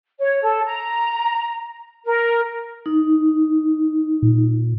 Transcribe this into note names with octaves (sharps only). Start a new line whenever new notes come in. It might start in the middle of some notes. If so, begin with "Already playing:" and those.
C#5
A4
A#5
A#4
D#4
A#2